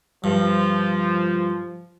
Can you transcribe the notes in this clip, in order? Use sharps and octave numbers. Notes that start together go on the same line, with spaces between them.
G2 F3